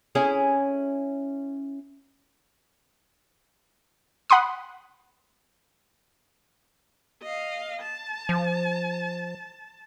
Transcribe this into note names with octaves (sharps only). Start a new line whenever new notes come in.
C#4 E4 G#4
F#5 B5 C6 D#6
D#5 F5
A5
F3